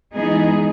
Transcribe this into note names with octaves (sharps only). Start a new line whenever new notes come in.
E3 G#3 B3 D#4 G#4